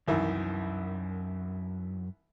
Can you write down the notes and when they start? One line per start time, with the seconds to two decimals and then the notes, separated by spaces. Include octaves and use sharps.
0.08 C2 F#2 D#3 E3